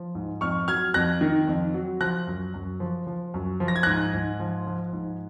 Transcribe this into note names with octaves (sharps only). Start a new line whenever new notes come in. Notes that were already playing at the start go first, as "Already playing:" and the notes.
Already playing: F3
G#2
F2 C#6 F6
F#3 F6 G#6
F2 F#6 A#6
D#3
F2
F#3
F3 F#6 A#6
F#2
F#2
F3
F3
F#2
F3
A#6
G#6
G#2 F#6 A#6
G#2
F3
F3
G#2